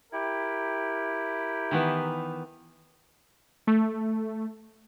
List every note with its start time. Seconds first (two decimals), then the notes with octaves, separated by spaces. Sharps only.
0.12 E4 G4 A#4
1.71 D#3 E3 B3
3.67 A3